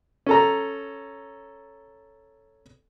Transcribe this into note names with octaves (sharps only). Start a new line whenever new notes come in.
C#4 A4 A#5